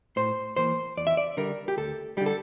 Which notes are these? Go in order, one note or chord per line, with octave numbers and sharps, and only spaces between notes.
A2 C5
E3 A#3 C5
E2 D5
E5
D5
D3 G3 A#4
G4
D2 A4
D3 G3 G4
A4